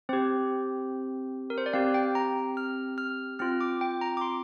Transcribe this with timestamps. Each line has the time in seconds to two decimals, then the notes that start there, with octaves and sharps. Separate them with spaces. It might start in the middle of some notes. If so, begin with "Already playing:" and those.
0.09 C4 G4 C5
1.50 A#4
1.58 C5
1.66 D5
1.73 C4 G4 F5
1.94 G5
2.15 A#5
2.57 F6
2.98 F6
3.39 C4 F4 F6
3.61 D6
3.81 G5
4.01 A#5
4.17 D6
4.21 C6